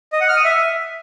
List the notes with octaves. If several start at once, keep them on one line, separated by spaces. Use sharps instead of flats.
D#5
F#5
F6
D#6
E5